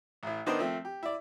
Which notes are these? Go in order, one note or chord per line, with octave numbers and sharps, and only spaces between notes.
A1 A2
D#3 B3 D4 D#4 A#4 C5
F3 A3 C4
G4
E4 D5